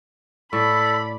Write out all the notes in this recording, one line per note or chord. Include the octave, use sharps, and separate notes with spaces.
A2 A4 D5 B5